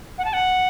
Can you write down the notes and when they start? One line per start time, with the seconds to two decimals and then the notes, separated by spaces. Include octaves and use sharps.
0.18 F#5
0.25 A5
0.33 F#5